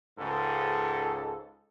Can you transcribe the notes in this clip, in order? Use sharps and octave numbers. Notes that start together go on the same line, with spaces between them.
C#2 G#2 C#3 G#3 A4